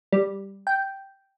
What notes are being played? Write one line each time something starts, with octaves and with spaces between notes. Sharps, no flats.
G3
G5